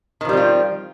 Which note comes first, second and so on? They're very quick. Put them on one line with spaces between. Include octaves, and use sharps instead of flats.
D#3 F3 G3 C4 F4